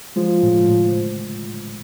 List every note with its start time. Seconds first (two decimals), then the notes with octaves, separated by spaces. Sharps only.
0.16 F3 G#3
0.43 A2
0.68 A2